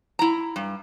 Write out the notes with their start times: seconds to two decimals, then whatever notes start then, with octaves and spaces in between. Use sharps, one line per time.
0.19 E4 A#5
0.56 G2